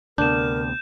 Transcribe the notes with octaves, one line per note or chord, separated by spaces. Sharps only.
D2 C3 B3 D4 A#4 G6 E7